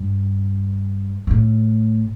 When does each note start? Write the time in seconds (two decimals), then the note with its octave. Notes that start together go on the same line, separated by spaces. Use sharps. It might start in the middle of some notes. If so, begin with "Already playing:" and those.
Already playing: G2
1.27 B2
1.31 A2